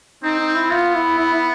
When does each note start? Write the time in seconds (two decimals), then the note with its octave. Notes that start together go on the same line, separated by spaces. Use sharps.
0.23 C4 D#4
0.39 D#4
0.55 E4
0.70 B3 F4
0.94 E4
1.18 E4
1.33 E4